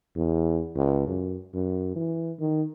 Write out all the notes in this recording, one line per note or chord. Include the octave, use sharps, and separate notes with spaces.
E2
C#2
F#2
F#2
E3
D#3